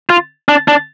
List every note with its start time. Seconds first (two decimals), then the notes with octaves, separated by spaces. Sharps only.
0.09 F4
0.49 D4
0.68 D4